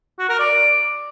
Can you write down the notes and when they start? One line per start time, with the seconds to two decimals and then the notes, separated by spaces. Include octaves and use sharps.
0.19 F#4
0.29 A#4
0.39 D5